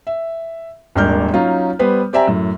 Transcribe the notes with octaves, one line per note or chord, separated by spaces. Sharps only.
E5
D#1 G#1 D4 A#4 F6 G6
F#3 C#4 D#4 F4
G3 B3 B4 C5
C4 G4 D5 E5 G#5 A#5
F#2 A2